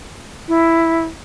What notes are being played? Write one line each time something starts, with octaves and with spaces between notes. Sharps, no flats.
E4